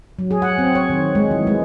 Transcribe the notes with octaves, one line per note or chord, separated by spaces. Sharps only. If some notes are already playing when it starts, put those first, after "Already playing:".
F#3
G#4
F#5
C4
C#5
D#3
G#3
E3
G#3